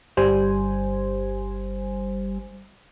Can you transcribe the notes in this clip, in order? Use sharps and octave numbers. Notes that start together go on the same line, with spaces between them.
G1 G3 C5 G#5